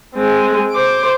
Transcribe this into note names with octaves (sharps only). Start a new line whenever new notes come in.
G#3 C4
C5 D6